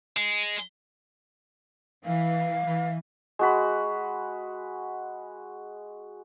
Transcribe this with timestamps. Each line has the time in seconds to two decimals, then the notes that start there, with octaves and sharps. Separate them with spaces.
0.17 G#3
2.05 E3 F5
2.65 E3
3.39 G#3 F#4 B5